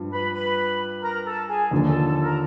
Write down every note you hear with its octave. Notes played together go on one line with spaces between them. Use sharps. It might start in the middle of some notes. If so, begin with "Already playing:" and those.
Already playing: G2 F3
B4 B5
B4 B5
A#4 A#5
A4 A5
G#4 G#5
D#2 D3 F3
A4 A5
A4 A5
A#4 A#5